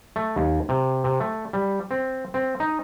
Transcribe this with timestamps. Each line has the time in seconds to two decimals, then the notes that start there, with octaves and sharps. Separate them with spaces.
0.16 A3
0.36 D#2
0.69 C3
1.04 C3
1.20 A3
1.53 G3
1.91 C4
2.34 C4
2.60 D#4